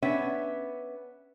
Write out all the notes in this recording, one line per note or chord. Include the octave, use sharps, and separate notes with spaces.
B3 C#4 D4 E5